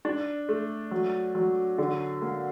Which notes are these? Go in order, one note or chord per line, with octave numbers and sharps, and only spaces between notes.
D4
A3
F#3
F#3
D3
A#3